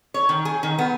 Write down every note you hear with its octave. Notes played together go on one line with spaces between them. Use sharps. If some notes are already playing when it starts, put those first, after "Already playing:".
C#5
D#3
G#4
D#3
B3